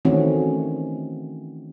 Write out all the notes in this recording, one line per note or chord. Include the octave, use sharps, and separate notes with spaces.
D#3 E3 A3 C4 C#4 F#4